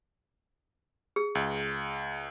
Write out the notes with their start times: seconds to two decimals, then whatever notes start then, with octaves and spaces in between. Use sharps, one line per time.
1.16 G#4
1.35 C#2